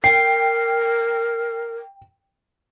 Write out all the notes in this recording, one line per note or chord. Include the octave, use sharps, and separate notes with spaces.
A#4 G5 C7